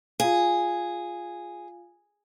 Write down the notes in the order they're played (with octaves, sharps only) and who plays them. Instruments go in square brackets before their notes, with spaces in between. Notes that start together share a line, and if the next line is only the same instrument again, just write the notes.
[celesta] F4 F5 [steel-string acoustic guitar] G#4